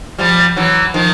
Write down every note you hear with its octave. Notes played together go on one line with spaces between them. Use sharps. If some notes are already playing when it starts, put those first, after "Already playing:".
F3 G3
E3 F#3
D#3 F3